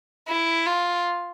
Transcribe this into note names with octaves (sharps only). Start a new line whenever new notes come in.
E4
F4